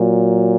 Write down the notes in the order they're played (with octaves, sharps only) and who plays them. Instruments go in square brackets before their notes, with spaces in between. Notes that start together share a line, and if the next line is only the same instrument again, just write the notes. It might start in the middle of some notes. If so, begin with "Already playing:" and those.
Already playing: [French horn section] A#2 F#3